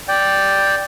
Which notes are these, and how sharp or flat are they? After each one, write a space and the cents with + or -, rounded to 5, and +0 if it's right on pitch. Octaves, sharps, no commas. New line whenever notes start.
D5 +0 G5 +0